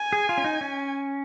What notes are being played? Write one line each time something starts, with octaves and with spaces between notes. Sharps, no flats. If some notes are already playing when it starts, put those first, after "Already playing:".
Already playing: G#5
G#4
F4
C#4
D#4
C#4